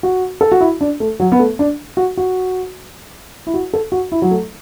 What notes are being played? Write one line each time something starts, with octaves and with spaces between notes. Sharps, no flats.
F#4
A4
F#4
E4
D4
A3
F#3
B3
A3
D4
F#4
F#4
E4
F#4
A4
F#4
E4
F#3
A3